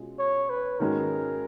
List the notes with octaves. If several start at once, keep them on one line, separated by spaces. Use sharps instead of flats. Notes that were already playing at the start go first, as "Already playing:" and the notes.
Already playing: B2 G#3 C#4 F4
C#5
B4
G#2 D#3 G#3 C#4 F#4 A#4